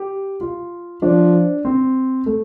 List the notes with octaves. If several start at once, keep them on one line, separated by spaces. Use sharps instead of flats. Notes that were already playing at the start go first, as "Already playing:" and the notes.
Already playing: G4
F4
F3 D4
C4
A3